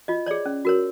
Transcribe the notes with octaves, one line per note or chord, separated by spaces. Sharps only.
F4 D#5
G#4 C#5 D5
C#4
F#4 A#4 C#5